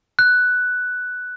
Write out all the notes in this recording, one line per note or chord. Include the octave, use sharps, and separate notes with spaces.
F#6